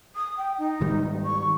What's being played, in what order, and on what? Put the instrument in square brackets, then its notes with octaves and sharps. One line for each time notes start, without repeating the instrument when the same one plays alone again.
[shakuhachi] D#6
G5
D#4
[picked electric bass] G#2 D#3 G3
[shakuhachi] C#6